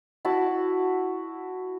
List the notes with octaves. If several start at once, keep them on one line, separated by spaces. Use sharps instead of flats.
E4 F#4 A5